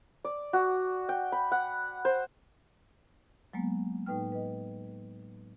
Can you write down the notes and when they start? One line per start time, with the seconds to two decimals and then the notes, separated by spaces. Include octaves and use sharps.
0.24 D5
0.53 F#4
1.09 G5
1.32 B5
1.52 F#5
2.05 C5
3.53 F#3 G#3 A#3 B3
4.06 A2 D#4 B4 G5 F6
4.32 B4 D#5